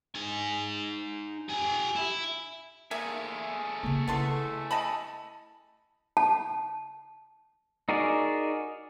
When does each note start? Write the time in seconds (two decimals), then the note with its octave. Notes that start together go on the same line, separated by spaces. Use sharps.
0.15 D#4 G#5
1.49 G4 G#5
1.96 E4
2.91 A3 A#3 G#4 E5 G#5
3.83 C#3 A#3
4.08 B3 E4 A4 C6
4.71 D#5 A5 B5
6.17 A5
7.89 D#4 F#4 G#4 A#4 D5